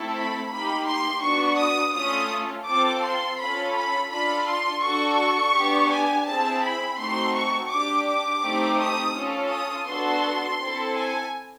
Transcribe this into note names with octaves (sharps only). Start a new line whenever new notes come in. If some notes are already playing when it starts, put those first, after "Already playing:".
Already playing: A3 C4 E4 A4
B5
A#3 D#4 G4 B5
C6
B3 D4 F#4 C#6
D#6
A3 C#4 F4 D#6
C4 F4 A4 D6
C6
C#4 F4 A4 B5
B5
D4 F4 A4 B5
C6
D4 F#4 A4 C#6
C#6
B3 D4 G4
G#5
C4 E4 G#4 A5
B5
A3 C4 D#4 F#4 C6
C#6
D4 G4 D6
D6
A3 C4 D#4 G4
D#6
C#4 F4 A4
D#6
B3 D4 F#4 A4 C6
C4 E4 A4
G#5